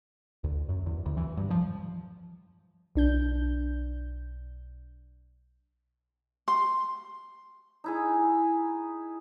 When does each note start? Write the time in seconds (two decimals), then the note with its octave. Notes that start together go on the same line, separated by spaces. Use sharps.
0.44 D2
0.69 F#2
0.86 E2
1.06 D2
1.17 E3
1.37 G2
1.50 F3
2.95 B1 D4 G6
6.48 C6
7.84 D#4 E4 G#4